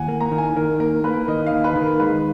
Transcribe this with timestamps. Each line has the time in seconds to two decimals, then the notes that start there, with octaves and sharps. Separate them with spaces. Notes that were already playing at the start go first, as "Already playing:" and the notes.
Already playing: D#2 F#5 G#5
0.08 A#3
0.20 A#5
0.32 D#3
0.38 G#5
0.56 D#3 A#4
0.80 A#3 A#4
1.04 A#3 B4
1.28 D#3 D#5
1.46 F5
1.52 D#2
1.64 B4
1.76 D#3
1.82 A#4
2.00 G#3 B4